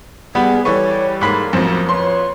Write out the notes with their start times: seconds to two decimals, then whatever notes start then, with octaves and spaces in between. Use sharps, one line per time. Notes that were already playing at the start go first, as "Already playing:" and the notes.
0.35 G3 B3 G#4
0.65 E3 G3 A4 B4 C#5 C#6
1.21 G#2 A#3 B5
1.53 A1 F2 F#3 C5
1.89 F4 B4 C#5 C6